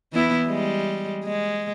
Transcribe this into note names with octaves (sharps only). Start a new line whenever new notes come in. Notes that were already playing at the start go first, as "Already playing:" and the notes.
E3 B3 E4
G3 G#3
G#3